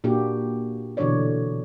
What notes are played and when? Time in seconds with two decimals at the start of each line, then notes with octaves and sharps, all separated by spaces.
0.04 A#2 A#3 D4 F#4 G4
0.97 B2 D3 E3 D4 C#5 D5